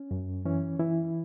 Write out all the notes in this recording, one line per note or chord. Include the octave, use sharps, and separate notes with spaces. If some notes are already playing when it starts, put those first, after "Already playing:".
Already playing: C#4
F#2
E3 C#4
E3 E4